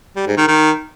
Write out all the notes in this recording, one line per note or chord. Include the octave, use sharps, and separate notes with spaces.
G3
G#2
D#3
D#3